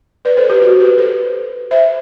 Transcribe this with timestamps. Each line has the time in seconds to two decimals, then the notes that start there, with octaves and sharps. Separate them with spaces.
0.25 B4 D5
0.37 A4 C5
0.49 G4 B4
0.62 F#4 A4
0.80 G4 B4
0.98 A4 C5
1.71 C5 E5